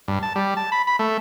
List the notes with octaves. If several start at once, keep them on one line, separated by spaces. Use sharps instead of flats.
G2
A5
G3
A5
B5
B5
A3